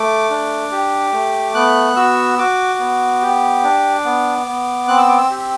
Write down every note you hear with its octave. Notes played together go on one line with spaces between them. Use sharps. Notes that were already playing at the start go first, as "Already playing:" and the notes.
Already playing: A3 D6
D4
G4
A3
B3 F#6
F#4 E6
F#4 D6
B3
G4
D4
B3
B3
C4 F#6
E6
D6
E6
G4